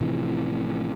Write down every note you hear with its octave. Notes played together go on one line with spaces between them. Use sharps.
A1 C3 E3 F3